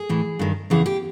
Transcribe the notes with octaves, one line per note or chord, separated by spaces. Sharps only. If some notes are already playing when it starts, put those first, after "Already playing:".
Already playing: G#4
A2 E3
G2 D#3
E2 C#3 E3 G#4
G4